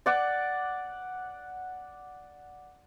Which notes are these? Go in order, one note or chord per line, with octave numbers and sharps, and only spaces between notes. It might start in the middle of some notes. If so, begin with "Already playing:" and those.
D5 F#5 D6